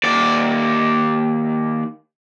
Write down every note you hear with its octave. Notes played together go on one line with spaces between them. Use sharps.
D#2 D5